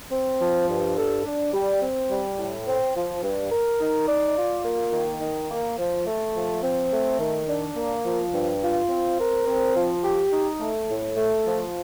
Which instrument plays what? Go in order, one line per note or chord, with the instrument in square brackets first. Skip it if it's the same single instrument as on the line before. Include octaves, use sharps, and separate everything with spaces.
[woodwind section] C4
F3
G2
A4
D4
G3
C4
G3
A2
C4
F3
G2
A#4
D#4
D5
F4
A#3
D#3
D#4
A#3
F3
A3
F3
C4
A3
D#3
D4
A#3
F3
G2
F4
C4
A#4
C4
F3
G4
D#4
A3
A2
A3
F3